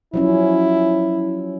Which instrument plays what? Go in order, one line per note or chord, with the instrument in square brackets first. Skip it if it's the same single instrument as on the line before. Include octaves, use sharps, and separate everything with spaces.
[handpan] F3 F#3 C#4 [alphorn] E4